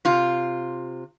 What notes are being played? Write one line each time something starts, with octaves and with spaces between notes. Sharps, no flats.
C3 F4